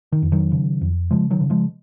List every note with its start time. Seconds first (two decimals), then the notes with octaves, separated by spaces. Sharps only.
0.12 D#3
0.22 F2
0.32 D#3 F#3
0.52 C#3
0.81 F2
1.11 C#3 F3 G#3
1.30 D#3 F#3
1.41 C#3
1.50 F3 G#3